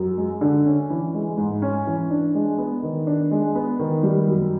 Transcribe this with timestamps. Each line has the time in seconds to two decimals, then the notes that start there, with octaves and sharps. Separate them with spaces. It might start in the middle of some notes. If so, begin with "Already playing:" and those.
Already playing: F#2
0.17 G#3
0.41 D3
0.66 C#4
0.90 E3
1.14 G#3
1.37 G#2
1.62 C#4
1.87 E3
2.11 D4
2.35 G#3
2.58 B3
2.83 D#3
3.07 D4
3.31 G#3
3.55 B3
3.79 D#3
4.03 G3
4.28 F#2